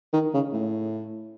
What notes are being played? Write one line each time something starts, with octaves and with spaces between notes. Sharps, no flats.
D#3
C#3
A2